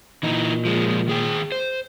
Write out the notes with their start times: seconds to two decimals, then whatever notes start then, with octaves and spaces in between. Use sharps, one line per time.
0.23 A#2 E3 D#4
0.65 F3 G#3
1.08 D#3 G#4 G5
1.52 C5